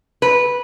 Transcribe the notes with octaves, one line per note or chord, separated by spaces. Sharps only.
B4